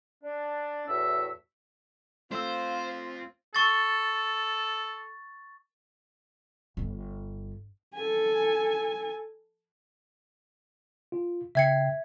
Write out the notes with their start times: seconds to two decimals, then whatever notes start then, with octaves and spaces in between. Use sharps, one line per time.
0.23 D4
0.88 E2 A2 F#4 E5 E6
2.32 A3 C4 F4 C5 F5 E6
3.55 A4 C#6 A6
6.77 G1
7.95 A4 G#5
11.12 F4
11.55 C#3 E5 G5 G#6 C7 C#7